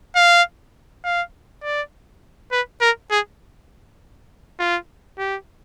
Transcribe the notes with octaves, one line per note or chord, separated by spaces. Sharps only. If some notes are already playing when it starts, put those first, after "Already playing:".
F5
F5
D5
B4
A#4
G#4
F4
G4